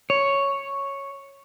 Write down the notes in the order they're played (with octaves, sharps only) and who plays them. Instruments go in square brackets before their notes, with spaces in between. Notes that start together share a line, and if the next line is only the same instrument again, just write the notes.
[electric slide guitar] C#5